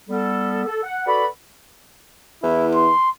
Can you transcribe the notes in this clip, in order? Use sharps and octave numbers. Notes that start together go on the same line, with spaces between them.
G3 B3 A4
A4
F#5
F#4 A4 B4 D5 F#5 B5
E2 E4
C6